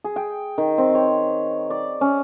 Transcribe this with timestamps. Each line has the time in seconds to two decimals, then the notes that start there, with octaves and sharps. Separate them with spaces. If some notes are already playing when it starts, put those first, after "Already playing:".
0.04 G#4
0.16 G5
0.58 D#3
0.78 C4
0.95 C#5
1.70 D5
2.01 C#4